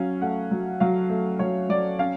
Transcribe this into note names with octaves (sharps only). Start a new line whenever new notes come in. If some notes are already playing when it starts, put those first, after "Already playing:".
Already playing: F#3 C#4 F5
A3 F#5
F#3
F#3 F5
A3
F#3 C#5
F#3 D5
C#4 F5